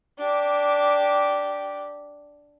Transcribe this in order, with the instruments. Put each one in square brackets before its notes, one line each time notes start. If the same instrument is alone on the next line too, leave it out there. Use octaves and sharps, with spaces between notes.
[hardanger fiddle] D4 G4